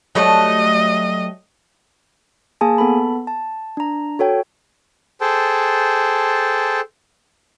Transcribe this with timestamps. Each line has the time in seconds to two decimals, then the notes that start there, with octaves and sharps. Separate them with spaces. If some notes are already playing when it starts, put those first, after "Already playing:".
0.15 F#3 G3 A3 D#5
2.61 A#3 G#4 G#5 A5
2.78 B3 A4 A5 B5
3.27 A5
3.77 D4 A#5
4.19 F#4 A4 C#5 G5
5.21 G#4 A4 C5 G5 A5